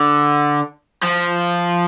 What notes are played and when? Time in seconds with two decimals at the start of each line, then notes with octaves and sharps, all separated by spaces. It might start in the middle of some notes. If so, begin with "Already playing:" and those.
Already playing: D3
1.03 F3